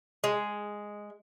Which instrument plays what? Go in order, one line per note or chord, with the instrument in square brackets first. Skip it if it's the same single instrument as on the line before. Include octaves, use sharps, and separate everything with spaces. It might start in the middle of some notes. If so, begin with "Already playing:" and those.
[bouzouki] G#3